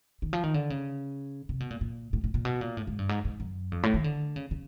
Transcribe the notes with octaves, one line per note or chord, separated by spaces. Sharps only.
D#3
F3
D#3
D3
C#3
C3
B2
A#2
A#2
A2
A2
A#2
B2
A#2
A2
G#2
G2
G#2
G#2
F#2
F2
A2
D#3
D3
C#3
C#3